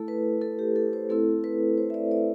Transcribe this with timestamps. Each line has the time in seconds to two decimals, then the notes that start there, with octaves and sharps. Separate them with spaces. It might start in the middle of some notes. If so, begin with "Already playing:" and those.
Already playing: A3 E4 A4
0.08 B4
0.42 A4
0.59 G4
0.76 A4
0.93 C5
1.09 A3 C4 E4 A4
1.44 B4
1.78 C5
1.90 E5
1.94 D5
2.11 D5